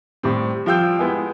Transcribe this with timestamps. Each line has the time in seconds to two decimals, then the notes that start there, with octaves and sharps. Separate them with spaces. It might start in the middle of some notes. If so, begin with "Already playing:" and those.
0.23 A2 G3 C4
0.66 F3 G3 F5 G5 E6 G6
0.99 G#3 B3 E4